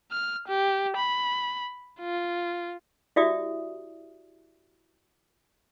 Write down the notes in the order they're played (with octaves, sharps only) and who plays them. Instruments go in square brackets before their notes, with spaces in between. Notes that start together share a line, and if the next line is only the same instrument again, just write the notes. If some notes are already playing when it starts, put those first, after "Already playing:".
[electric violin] F6
G4
B5
F4
[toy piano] E4 F#4 G4 D5 E5 D#6